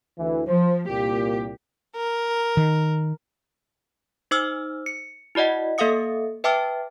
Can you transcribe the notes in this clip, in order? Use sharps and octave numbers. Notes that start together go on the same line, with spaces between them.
D2 E3
F3 C5
C2 A#2 G4
A#4
D#3
D#4 C5 D6 E6 F6
C#7
E4 F#4 D5 D#5 F#5
A#3 A4 E5 F5 D#6 C#7
B4 E5 G5 A5 D6 F6